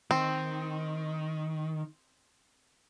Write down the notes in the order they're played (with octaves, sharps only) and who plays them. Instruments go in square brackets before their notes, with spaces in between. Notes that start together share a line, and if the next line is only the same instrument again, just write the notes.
[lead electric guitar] D#3 [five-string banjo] C4